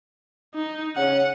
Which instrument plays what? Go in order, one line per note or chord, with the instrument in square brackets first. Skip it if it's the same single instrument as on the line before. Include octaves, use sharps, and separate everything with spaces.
[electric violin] D#4
[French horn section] C#3 C#4 [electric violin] F#5